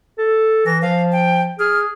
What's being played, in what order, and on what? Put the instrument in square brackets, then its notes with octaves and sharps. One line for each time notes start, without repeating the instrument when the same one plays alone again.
[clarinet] A4
[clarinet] E3 [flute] A#6
[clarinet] F3 [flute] F5
[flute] G5
[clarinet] G#4 [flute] F6